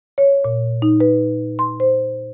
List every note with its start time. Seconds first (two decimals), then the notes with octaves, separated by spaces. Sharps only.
0.18 C#5
0.45 A#2
0.82 D#4
1.00 B4
1.59 C6
1.80 C5